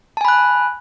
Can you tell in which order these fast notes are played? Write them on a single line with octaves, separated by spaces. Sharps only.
A5 G#5 B5 F#6